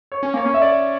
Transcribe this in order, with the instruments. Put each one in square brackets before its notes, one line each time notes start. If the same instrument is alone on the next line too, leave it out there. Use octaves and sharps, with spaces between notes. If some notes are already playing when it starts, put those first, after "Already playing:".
[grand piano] C#5
[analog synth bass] C#4
[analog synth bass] A#3 [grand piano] C#5
[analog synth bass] C#4
[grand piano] E5
D5